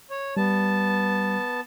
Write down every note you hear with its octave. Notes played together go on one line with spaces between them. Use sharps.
C#5
G3 B3 A5